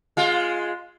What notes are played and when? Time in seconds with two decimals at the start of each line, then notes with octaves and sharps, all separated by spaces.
0.17 G#3 F4